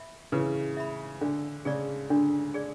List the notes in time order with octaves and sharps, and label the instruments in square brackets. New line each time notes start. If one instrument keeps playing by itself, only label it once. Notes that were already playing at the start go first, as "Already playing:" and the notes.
Already playing: [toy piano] E5 B5
[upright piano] C#3 E3 [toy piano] B4
[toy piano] E5 B5
[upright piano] D3 [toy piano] D4
[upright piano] C#3 [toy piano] G#4 D5
[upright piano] D3 [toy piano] D4
[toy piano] G#4 D5